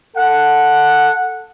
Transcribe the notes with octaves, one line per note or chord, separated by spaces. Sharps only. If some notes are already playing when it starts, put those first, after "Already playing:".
A4 F#5